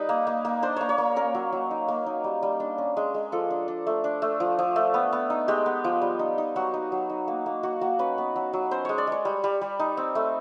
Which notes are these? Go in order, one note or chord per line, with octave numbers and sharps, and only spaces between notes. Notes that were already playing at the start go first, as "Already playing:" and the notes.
Already playing: G3 D#4 B4
A#3
A#3
A#3
D4 C5
A#3 C#5
C#5
A#3
C#4 A#4
F#3
F#3
D#4
A#3
D#4
G3
G3
D4
C#4
G#3
G#3
F3 A4
D4
D4
A3
D4
A3
F3
F3
A3
B3
B3
D#4
G#3 G4
B3
F3
G3
D#4
D#4
F#3 F#4
D#4
F#3
D#4
A#3
A#3
A#3 F#4
A#3 F#4
C#4 B4
B3
F#3
F#3
C#4 C5
G#3 C#5
D5
G#3 C#5
G3
G3
G3
D#4
C4
A3